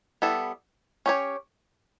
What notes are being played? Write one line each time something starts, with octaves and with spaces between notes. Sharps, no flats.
G3 B3 E4 A4
C#4 G4 C#5